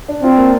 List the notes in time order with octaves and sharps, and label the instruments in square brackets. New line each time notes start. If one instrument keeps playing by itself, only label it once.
[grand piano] D4
[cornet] C4 [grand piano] F4
[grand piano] A#3